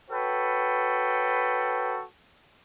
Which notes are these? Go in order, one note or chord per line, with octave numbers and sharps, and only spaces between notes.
F#4 A4 B4 C#5 G5